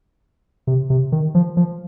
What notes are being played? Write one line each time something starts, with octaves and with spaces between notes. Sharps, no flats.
C3
C3
D#3
F3
F3